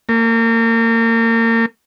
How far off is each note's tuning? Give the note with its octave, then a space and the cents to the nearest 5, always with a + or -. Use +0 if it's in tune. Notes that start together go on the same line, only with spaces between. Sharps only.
A#3 -35